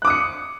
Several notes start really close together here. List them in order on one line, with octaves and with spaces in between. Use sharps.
F#6 D6 D#6 C#7